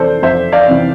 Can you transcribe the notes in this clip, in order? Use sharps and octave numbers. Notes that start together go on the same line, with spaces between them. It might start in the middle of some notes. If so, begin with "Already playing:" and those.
Already playing: F2 C3 E3 A4 C5 D5
F2 C5 E5
D5 F5
C3 E3